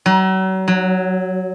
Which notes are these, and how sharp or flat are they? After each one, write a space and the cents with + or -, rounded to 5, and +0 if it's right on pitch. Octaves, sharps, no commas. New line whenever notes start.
F#3 +35
F#3 -5